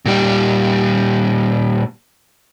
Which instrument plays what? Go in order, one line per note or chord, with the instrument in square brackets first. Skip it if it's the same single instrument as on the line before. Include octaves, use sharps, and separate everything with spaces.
[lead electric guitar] A#2 G3